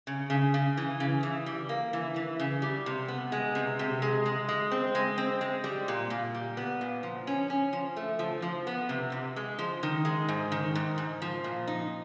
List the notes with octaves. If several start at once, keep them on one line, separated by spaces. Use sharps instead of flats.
C#3
C#3
C#3
E3
C#3
E3
G3
A#3
E3
E3
C#3
G3
C3
B3
G#3
C3
C3
G#3
G#3
G#3
C4
G#3
C4
G#3
G3
A#2
A#2
G3
B3
A#2
F3
C#4
C#4
F3
A3
F3
F3
B3
C3
C3
G#3
F3
D#3
G#3
G#2
D#3
G#2
G#2
F3
A#2
D#4